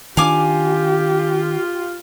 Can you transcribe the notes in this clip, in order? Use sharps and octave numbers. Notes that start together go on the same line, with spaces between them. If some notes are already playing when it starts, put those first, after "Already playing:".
D#3 C#4 D4 F4 G4 F5 G#5 D6